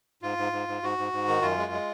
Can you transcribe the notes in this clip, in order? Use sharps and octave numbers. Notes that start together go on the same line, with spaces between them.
G#2 F4
G#2
G#2
G#2
G#2 F#4
G#2
G#2
D#3
F#2 F4
G#3
G#3